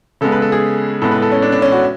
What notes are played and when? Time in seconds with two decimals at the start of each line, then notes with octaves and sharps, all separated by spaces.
0.21 C#3 G#3 B3 A4
0.32 B4
0.42 A4
0.52 G#4
1.02 A2 G#3 B3 A4
1.11 B4
1.22 A4
1.32 C#4
1.42 D4
1.52 D4
1.62 C#4
1.72 F#4